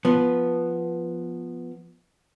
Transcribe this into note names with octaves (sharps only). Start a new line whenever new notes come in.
F3 B3